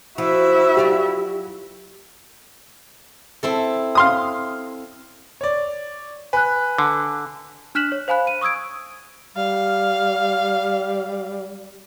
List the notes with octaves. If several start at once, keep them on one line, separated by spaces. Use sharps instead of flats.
F3 E4 F#4 E5
F#3 F4 G4 D5
C4 E4 A4
F5 C6 D#6
C#5 D5
B4 G#5 F#6
D3
D4 F6 F#6 B6 E7 F#7
C#5
C5 F5 G#5 B5 F#6
D#7
C#6 D#6 E6 G#6 D7
G3 F5